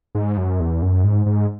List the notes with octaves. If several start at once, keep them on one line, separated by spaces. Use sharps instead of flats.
G#2
F#2
E2
F#2
G#2
G#2